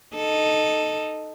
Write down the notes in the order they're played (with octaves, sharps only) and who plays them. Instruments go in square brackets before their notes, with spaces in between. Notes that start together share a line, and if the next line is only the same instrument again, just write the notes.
[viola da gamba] D#4 A4